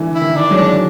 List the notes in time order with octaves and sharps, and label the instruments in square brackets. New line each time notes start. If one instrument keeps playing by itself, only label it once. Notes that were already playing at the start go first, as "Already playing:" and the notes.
Already playing: [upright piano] D3 E3
[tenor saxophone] E4
[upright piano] D#3
[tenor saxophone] D4
[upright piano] F#3 G#3
[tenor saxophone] D4